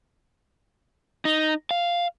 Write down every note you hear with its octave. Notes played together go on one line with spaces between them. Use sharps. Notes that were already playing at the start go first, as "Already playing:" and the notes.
D#4
F5